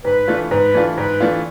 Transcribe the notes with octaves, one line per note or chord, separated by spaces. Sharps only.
G#2 B4
E3 A3 D4 F4
G#2 B4
E3 A3 D4 F4
G#2 B4
E3 A3 D4 F4